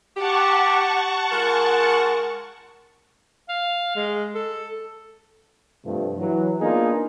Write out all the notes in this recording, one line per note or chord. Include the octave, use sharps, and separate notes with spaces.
G4 F#5 A5 C#6
G#3 F4 A#4
F5
G#3
A4
G2 C3 F3 A3
E3 F#3
A#3 B3 D4 D#4 F4 G#4